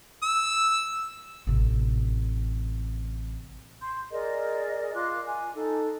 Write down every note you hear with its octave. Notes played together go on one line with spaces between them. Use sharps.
E6
A1 C3
C6 G6
G#4 A#4 D5 D#5
F4 C6 D6 F#6
G#5
D#4 A4